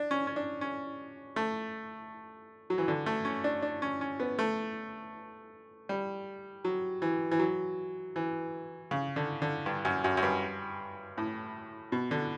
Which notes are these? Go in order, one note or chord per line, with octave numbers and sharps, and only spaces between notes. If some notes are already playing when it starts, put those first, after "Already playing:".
Already playing: D4
C#4
C#4
D4
C#4
A3
F#3
E3
D3
A3
C#4
D4
D4
C#4
C#4
B3
A3
G3
F#3
E3
E3
F#3
E3
C#3
D3
D3
G2
F#2
F#2
F#2
G2
A2
B2
D3